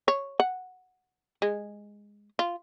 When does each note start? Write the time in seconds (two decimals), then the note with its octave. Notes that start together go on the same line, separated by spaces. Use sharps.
0.08 C#5
0.40 F#5
1.42 G#3
2.39 F4